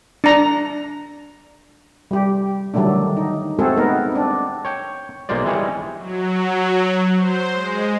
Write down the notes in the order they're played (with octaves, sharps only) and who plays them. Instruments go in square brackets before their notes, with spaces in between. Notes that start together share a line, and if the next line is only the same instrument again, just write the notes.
[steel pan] D4 A#5
G3 G4
D3 D#3 F#3 G3 A3 D4
D#4
G#3 A3 C4 F#4 G#4 A4
B3 D#4 A#4
C4 D4
[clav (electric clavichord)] C#5 G5
B1 G#3 A#3 F4 C5 D5
E3 G3 G#3 G#4 C#5
[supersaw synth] F#3
C5
G#3